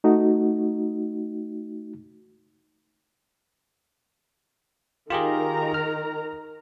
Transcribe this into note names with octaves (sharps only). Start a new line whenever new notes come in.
A3 D#4 F#4
D#3 F4 G4 G#4 A#4 A#5
F6